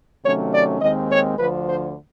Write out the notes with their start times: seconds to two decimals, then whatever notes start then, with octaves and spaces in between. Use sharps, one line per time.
0.24 C3 D#3 F#3 A3 C#4 C#5
0.53 D5
0.81 D#2 D#3 G#3 C4 D#5
1.10 C#5
1.38 D2 D3 F3 B4
1.67 C5